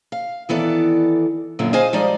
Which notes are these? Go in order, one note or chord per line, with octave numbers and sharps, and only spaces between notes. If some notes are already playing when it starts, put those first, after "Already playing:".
F5
D#3 E3 B3 A4 D5
F#2 A#2 D3 B3
G#4 C5 D#5 F5 G#5
F3 G3 G#3 D#4 D5